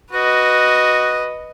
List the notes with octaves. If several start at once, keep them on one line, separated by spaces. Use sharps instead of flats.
F#4 B4 D#5